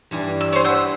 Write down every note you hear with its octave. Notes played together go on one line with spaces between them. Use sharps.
G2 E3 G3
E6
C#4 C5
B4 F#5 G#5 E6 G6